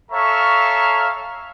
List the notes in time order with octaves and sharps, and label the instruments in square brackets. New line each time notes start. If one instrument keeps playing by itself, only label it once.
[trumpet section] A4 C#5 E5 F5 A#5 C#6